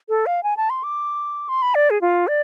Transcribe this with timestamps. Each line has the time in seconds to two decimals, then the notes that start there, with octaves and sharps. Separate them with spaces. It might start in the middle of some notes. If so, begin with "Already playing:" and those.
0.09 A4
0.26 F5
0.43 G#5
0.57 A5
0.70 C6
0.83 D6
1.49 C6
1.62 B5
1.75 D5
1.90 G#4
2.01 F4
2.28 D5